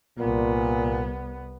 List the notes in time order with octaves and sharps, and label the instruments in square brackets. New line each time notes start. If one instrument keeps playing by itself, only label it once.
[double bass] C2 B3 [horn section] A#2